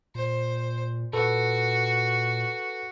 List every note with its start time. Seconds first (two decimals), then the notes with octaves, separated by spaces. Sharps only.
0.15 A#2 C5
1.13 A#2 F#4 A4 B4